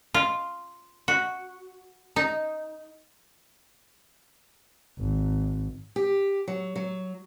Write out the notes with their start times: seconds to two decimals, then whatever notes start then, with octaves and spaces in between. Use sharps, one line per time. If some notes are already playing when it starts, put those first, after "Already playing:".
0.14 F4
1.08 F#4
2.16 D#4
4.99 G#1
5.96 G4
6.48 F#3
6.76 F#3